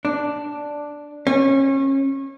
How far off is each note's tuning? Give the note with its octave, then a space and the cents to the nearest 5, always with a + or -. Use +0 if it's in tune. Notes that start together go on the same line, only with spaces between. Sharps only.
D4 +0
C#4 -30